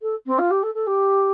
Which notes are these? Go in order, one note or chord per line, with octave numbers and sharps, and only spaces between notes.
A4
C4
F4
G4
A4
A4
G4